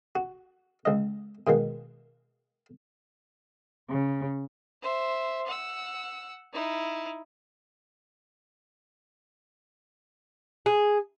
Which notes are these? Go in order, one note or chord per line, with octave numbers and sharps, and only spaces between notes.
F#4
C#2 D#5
B2 D#3 G#3 A#3
C#3
C5 E5
F#5 E6
D#4 E4
G#4